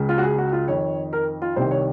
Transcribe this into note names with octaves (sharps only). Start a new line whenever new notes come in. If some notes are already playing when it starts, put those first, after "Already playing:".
Already playing: C#2 C#3
F4
F#4
G#4
F#4
F4
F2 D#3 C#5
A#4
F4
C2 C3 D#3 C5
C#5